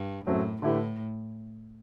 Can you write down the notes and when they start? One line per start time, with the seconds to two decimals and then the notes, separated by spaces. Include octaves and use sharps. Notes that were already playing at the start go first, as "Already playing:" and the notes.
Already playing: G2
0.26 F#2 A2 F#3 A3 C4
0.62 A2 D3 A3 E4 G4 B4